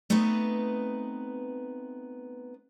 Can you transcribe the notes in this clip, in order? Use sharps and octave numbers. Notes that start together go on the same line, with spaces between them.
A3 B3 C4 D#4 B4